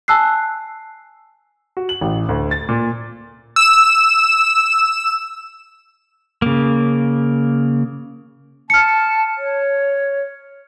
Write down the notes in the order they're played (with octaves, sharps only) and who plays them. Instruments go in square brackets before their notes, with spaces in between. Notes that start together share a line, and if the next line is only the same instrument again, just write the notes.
[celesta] G#5 A5 E6 F#6 C7
[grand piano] F#4
F#7
A1
D2
A6
A#2
[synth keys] E6 E7
[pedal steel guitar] C#3 A#3
[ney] A5 [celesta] F6 C#7
[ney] C#5